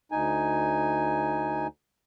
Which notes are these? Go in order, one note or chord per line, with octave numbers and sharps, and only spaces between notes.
D2 D#4 G#5